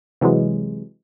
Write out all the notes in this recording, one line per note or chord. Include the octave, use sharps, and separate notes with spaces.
C3 E3 F#3 G#3